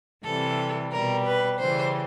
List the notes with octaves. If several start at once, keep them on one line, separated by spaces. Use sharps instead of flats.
C3 E3 G3 A4
B2 G3 A#4
B4
C#3 E3 G3 C5